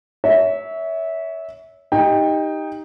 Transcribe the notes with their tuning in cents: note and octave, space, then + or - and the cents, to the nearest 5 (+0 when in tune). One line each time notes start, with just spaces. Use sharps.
C#5 +25 E5 -15
D#4 +0 G4 +0 G5 +25